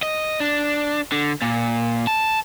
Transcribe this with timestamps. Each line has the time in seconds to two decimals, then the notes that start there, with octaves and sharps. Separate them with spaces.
0.03 D#5
0.40 D4
1.12 D3
1.42 A#2
2.07 A5